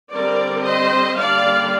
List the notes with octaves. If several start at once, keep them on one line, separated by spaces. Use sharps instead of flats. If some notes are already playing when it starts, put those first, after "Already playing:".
D3 G3 C4 A#4 D5
C5 D#5
D3 G3 A#3 D4 D5 F5